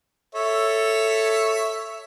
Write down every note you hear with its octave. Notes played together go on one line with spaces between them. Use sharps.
A4 C#5 E5